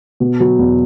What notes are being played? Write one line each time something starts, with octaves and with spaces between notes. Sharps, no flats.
B2
F#3
E2